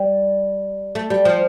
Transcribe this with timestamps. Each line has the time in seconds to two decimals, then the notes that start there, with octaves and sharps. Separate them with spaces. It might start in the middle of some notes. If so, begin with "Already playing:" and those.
Already playing: G3
0.95 A3
1.10 G3
1.25 F3